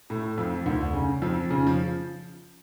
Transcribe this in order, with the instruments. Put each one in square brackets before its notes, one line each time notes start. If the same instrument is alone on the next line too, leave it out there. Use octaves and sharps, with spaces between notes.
[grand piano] A2 A3
F2 F3
D2 D3
C#3
F2 F3
C#3
F3